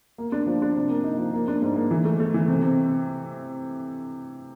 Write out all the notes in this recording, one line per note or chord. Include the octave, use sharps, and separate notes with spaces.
A#3
D4
F3
D4
C3
A#3
D#4
F3
A#3
D4
G#2
A#3
E3
A3
A3
E3
C3
C3